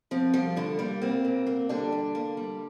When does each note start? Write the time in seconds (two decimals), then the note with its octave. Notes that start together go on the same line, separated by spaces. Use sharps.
0.11 F3 C4
0.34 F3 G3 F4
0.56 G2 D3 D4
0.79 G3 A#3
1.02 A#3 C4
1.25 A#2
1.47 A#3
1.69 D3 G3 D4
1.92 G3
2.15 A#3
2.37 G3